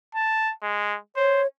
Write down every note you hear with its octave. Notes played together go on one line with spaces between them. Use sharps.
A5
G#3
C5 C#5